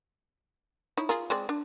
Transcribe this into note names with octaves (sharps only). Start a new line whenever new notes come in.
D#4 E4 C#5
F4 G#4 A#4
G#3 C4 D5
D4